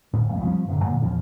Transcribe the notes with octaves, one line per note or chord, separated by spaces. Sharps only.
D1 A2 C#4
B1 F2 A3
F3 G3 C4 C#4
D1 F#2 D3
F2 A#2 D3 F#3
A#1 E2 F3 C#4